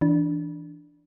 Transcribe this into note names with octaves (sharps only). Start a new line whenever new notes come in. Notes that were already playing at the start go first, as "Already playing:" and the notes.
E3 D4